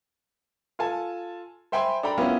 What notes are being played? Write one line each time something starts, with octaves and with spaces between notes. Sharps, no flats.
F4 A4 G#5 A5
C5 E5 G5 G#5 B5 C6
D4 A4 G5 A#5 B5
B3 C#4 E4 F4 G4 A#4